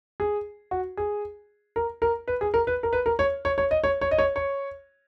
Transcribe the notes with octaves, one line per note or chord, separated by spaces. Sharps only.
G#4
F#4
G#4
A#4
A#4
B4
G#4
A#4
B4
A#4
B4
A#4
C#5
C#5
C#5
D#5
C#5
C#5
D#5
C#5
C#5